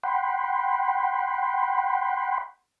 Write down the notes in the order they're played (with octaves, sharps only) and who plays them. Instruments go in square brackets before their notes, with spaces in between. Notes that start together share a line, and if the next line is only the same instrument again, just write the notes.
[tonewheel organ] F#5 G5 B5 C6